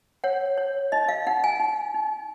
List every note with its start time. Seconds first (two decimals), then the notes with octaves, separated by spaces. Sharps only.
0.24 C#5 F#5
0.58 C#5
0.92 D#4 D#5
1.09 F5
1.27 D#4 F#5
1.44 G#5
1.60 D#4
1.94 D#4